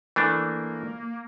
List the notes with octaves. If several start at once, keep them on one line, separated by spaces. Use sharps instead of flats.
E3 A3 A#3 D4